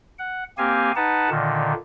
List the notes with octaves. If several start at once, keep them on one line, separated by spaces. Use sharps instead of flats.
F#5
A#3 C4 G4 F5 G#5
D#4 B4 F#5 A5
A#2 D3 D#3